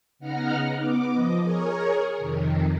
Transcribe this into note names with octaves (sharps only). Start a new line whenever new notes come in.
C#3 B3 D#4 F#5 A#5 F6
B3 D6
F3 D#5
G#4 A#4 C#5
F2 C3 D#3